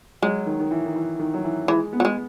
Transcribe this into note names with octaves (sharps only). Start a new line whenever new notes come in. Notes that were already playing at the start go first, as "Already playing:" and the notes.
F#3 G#3
D#3
D#3
E3
D#3
E3
D#3
F#3
E3
E3 G#3
B3
F#3
G#3